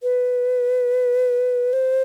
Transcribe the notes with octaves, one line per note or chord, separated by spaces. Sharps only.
B4
C5